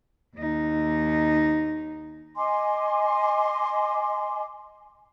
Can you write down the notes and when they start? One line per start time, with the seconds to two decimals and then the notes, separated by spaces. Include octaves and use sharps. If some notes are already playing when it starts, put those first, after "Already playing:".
0.37 D#2 D#4
2.36 D#5 G#5 C6 D6